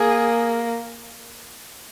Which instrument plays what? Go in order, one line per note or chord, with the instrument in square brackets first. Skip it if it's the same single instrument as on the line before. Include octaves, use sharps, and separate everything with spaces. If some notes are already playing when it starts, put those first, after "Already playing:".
Already playing: [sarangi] A#3 [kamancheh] G#4